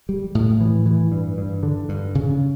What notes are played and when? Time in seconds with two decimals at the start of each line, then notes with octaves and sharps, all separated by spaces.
0.09 G3
0.35 A2
0.60 E3
0.86 E3
1.12 G2
1.38 G2
1.63 D3
1.89 G2
2.15 C#3